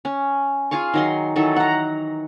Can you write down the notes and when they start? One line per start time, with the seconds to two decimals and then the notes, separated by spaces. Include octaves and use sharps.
0.05 C#4
0.71 F4 G#4 F5 C#6
0.93 D#3 F#3 C6
1.36 D#3 E3 F#3 A4
1.56 F#5 A#5